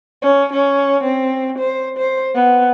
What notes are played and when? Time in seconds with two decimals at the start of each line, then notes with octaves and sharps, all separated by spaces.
0.22 C#4
0.53 C#4
1.04 C4
1.59 C5
1.97 C5
2.35 B3